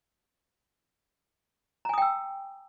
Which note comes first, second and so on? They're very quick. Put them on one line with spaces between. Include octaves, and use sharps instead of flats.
A#5 G#5 D#6 G5 E6